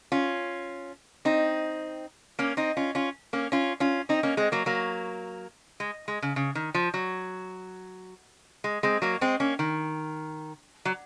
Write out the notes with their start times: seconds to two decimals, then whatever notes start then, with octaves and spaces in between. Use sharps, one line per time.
0.12 C#4 F4
1.25 C4 D#4
2.39 A#3 C#4
2.57 C4 D#4
2.77 C#4 F4
2.95 C#4 F4
3.33 A#3 C#4
3.52 C#4 F4
3.80 C#4 F4
4.09 C4 D#4
4.23 A#3 C#4
4.37 G#3 C4
4.52 F#3 A#3
4.66 F#3 A#3
5.80 G#3
6.08 G#3
6.22 C#3
6.36 C#3
6.55 D#3
6.74 F3
6.94 F#3
8.64 G#3
8.83 G#3 C4
9.02 F#3 A#3
9.21 G#3 C4
9.40 A#3 C#4
9.59 D#3
10.85 F#3